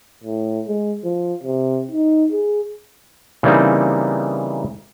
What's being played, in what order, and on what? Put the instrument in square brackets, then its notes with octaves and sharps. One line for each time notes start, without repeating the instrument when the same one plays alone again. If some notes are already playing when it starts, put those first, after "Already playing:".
[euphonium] A2
G#3
F3
C3
D#4
G#4
[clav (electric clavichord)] C#3 E3 G3 A#3 C4 D#4